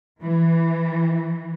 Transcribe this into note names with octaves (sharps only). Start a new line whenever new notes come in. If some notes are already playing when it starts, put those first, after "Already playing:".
E3